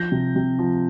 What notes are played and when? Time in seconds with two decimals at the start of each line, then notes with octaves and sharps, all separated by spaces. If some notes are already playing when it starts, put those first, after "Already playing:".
Already playing: F3 G6 A#6
0.12 C3
0.36 C3
0.59 F3